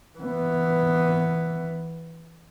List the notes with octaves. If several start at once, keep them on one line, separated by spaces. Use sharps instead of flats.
E3 B3